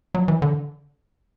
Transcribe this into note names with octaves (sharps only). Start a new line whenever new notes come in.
F#3
E3
D3